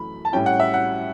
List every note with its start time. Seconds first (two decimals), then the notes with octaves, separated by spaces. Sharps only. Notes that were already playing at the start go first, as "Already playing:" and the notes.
Already playing: F#2 E3 A3 B5
0.25 A5
0.32 A2 G3 C#4 E4 G5
0.46 F#5
0.60 E5
0.74 F#5